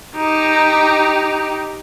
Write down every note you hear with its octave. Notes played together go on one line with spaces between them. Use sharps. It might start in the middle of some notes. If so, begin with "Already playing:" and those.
D#4 G4